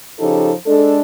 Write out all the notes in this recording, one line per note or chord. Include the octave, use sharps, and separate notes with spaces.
C#3 F3 D#4 G4 A4
G#3 D4 A4